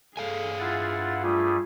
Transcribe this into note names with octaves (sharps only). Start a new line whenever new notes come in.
G2 G#4 A4 F5 G#5
E4 F4 F#5 A6
G3 A3 F4 G#4